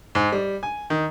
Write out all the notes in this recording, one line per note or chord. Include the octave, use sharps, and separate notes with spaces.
G#2
G3
G#5
D#3